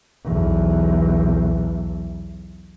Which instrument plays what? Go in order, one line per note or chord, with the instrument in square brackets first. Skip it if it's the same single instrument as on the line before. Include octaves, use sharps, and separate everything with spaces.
[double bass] B1 E2